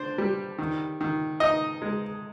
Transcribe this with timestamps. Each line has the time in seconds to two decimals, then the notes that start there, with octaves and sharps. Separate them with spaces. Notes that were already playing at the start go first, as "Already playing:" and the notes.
Already playing: D4 C5
0.18 G3
0.58 D#3
1.01 D#3
1.40 D#4 D#5
1.82 G#3